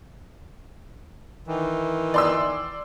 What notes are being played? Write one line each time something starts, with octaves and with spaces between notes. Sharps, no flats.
D#3 E3
D5 C6 E6